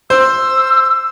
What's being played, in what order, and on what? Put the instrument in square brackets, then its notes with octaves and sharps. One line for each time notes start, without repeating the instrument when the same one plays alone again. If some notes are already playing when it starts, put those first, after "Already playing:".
[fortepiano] C5 [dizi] E6